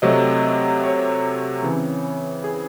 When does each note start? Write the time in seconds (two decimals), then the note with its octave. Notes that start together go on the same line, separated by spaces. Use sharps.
0.02 C3 F#3 A3 C4 D#5
0.83 C#5
1.63 C#3 E3 C4
2.44 G#4